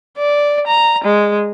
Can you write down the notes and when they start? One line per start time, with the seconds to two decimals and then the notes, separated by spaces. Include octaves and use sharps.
0.18 D5
0.67 A#5
1.04 G#3